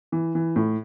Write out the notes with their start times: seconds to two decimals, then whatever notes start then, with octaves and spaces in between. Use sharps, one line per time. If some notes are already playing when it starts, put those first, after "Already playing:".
0.12 E3
0.35 E3
0.56 A2